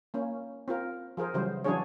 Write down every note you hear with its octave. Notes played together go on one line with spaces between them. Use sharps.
A#3 C#4
C4 F4 A#4
F3 G#4 A#4 C5
C#3 E3 F#3 G3 C5
E3 F#3 C#4 D4 G#4 C#5